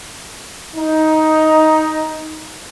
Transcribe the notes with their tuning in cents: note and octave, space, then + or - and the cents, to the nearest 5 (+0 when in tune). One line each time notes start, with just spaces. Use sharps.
D#4 +10